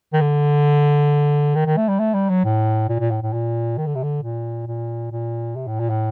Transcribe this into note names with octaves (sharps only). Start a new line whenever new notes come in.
D#3
D3
D#3
D#3
A3
G3
A3
G3
F#3
A2
A#2
A#2
A2
A2
A#2
D#3
D3
C3
D3
A#2
A#2
A#2
C3
A2
A#2
A2